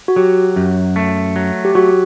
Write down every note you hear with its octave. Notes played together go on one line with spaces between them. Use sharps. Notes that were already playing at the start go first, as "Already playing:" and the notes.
F#4
F#3 G4
F#2
A3
F#3
G4
F#3 F#4